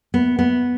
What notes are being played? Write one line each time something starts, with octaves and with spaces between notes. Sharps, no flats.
B3
B3